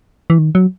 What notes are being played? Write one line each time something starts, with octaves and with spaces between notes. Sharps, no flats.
E3
D#3
F#3